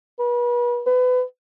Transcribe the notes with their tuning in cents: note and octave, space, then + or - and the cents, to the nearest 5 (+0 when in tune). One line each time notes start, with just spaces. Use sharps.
B4 -35
B4 +30